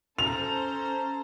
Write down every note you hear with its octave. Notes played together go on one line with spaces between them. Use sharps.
C#4 A4 C5 A#5 F7